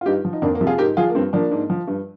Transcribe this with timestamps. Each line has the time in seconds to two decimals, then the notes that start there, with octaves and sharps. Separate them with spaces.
0.01 F4
0.06 G2 D#4 G4
0.25 F3
0.33 D#4
0.42 F2 A#3 D4
0.55 A#3
0.61 C3 F3
0.67 F4 G#4
0.78 G#2 G4 A#4
0.97 F3 F4 G#4
1.09 A#3
1.15 G2 C4
1.33 F3 A#3 D4
1.51 G#2
1.70 F3
1.88 G2